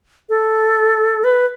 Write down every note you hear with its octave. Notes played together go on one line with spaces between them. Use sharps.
A4
B4